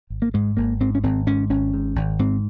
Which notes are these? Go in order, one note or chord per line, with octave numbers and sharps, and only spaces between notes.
G#1
A#3
G#2 G#3
G#1 A#3
G#2 C4
C#4
G#1 C4
G#2 C#4
G#1 C#4
G#2
G#1
G#2 C4